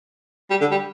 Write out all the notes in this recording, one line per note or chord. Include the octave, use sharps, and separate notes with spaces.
G3
D3
G3